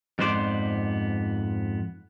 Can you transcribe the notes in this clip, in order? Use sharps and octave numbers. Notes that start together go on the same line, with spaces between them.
F2 G#2 B3 C5 D5